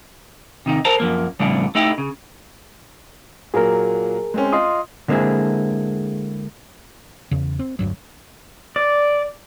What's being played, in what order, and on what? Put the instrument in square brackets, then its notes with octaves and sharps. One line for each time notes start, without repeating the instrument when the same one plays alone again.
[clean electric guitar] C3 D#3 D#4
A4 A#4 C5 A5 A#5
F#2 F3 A#3
F2 A2 C#3 G3 A3 D4
A3 D#4 E4 G4
C#3
[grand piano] A#2 F#3 A#3 [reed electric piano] G#4 A#4
[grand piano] G#3 C4 C#4
[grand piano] F4 [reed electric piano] D#5 C6 D#6
[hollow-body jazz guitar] D3 G#3 A#3 C4 E4 G#4
[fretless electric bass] E2 C#3
C4
E1 D2 G2 F#3
[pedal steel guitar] D5